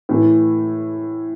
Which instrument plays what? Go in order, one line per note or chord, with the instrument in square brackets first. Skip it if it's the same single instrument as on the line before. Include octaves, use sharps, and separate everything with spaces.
[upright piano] A2 E3 A3